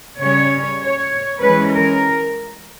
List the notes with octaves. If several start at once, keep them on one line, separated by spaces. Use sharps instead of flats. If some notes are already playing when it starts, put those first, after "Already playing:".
C#3 G3 C#4 C#5
C#5
E3 G#3 C#4 B4
A#4